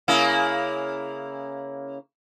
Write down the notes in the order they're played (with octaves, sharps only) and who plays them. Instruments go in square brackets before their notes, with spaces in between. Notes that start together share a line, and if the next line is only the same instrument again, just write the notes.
[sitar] C#3 A#3 E4